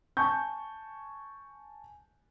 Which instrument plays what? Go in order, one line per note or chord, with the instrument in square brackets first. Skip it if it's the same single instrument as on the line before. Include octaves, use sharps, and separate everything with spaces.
[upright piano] G#5 A5 C#6 G6